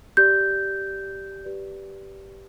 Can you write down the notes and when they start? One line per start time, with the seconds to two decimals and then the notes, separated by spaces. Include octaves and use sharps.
0.17 G4 D5 G6
1.44 G4 B4 D5